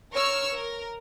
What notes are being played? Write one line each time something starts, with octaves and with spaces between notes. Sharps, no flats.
A#4 C#5 C#6 E6 F6
A#4